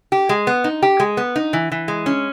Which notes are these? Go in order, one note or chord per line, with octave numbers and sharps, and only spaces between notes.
G4
G#3
B3
D#4
G4
G#3
B3
D#4
E3
E3
G#3
C#4